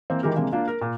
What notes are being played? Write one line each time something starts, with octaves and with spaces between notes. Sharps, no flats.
E3 A#3 C4
D#3 E3 G#3 G4 A#4
C3 E3 G#3 A#3 D4
A#3 D4 F4
A#4
A#2